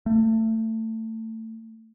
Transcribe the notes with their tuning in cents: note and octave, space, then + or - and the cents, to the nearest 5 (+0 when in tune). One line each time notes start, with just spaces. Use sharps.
A3 +25